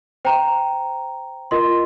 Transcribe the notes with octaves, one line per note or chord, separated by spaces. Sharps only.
C5 G5 A#5
F4 A#4 D#5 C6